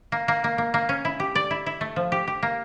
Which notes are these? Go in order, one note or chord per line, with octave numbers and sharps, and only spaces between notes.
A#3
A#3
A#3
A#3
A#3
C#4
E4
G4
D5
E4
E4
A3
F3
G4
G4
A#3